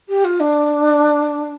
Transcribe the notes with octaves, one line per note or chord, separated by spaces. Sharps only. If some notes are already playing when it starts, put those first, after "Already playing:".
G4
F4
D4